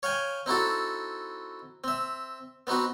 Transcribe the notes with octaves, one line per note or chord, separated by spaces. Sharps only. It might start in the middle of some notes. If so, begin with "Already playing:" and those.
C#5 F5 G5 G#5
C4 D#4 E4 F#4 A4
C4 E5
B3 C4 D#4 F#4 B4